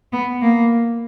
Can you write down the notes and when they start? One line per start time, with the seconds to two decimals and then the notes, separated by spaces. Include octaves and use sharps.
0.12 B3
0.41 A#3